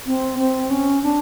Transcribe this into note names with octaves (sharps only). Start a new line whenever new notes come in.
C4
C4
C#4
D4